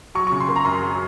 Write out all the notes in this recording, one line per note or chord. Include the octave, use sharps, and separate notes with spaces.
F#3 C#6
C#6
C#3
C6
A#3
A#5
F#2 C6
F#3